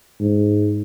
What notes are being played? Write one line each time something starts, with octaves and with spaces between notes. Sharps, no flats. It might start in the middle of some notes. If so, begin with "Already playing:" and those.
G#2